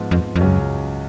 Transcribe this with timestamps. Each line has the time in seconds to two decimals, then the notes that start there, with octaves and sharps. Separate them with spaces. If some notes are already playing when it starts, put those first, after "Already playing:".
Already playing: G#2 F3 B3 F4
0.11 F2
0.36 F2
0.41 C#2 F#2 C#3 F#3 C#4